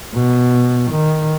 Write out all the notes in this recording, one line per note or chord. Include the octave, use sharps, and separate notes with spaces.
B2
D#3